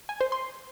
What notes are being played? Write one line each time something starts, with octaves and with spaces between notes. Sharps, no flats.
G#5
C5
C6